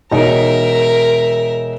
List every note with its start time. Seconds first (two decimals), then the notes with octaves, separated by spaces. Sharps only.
0.11 E1 D#4 A#4 E5